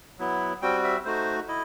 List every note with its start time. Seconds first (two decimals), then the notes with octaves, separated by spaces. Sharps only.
0.19 F#3 B3 E4
0.62 G3 C4 F#4 G5
0.84 E5
1.05 A3 D#4 F#4 C5
1.48 E4 D#5